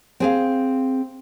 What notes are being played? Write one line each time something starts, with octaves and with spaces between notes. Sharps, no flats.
C4 G#4 F5